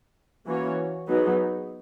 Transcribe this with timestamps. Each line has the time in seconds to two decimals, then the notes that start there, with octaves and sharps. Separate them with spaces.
0.47 E3 A#3 C#4 F#4 C#5
1.08 F#3 B3 D#4 G#4